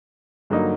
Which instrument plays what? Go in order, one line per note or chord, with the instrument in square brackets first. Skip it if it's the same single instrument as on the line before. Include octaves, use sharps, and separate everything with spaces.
[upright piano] G2 D3 F#3 A#3 D#4